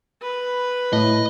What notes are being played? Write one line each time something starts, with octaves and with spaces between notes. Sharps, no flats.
B4
A2 D#5